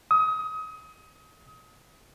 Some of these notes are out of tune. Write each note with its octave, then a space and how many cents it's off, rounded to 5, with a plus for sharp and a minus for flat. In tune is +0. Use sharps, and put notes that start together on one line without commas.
D#6 +30